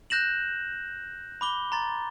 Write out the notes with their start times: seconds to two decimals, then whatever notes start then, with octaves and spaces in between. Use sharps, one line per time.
0.10 F#6 G6 A#6 E7 F#7
1.41 B5 D6 G7
1.72 A#5 C6 A6